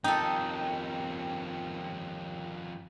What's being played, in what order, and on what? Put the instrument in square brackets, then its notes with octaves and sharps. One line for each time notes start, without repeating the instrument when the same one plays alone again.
[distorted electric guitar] F2 D#3 [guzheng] D#4 A4 [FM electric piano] G5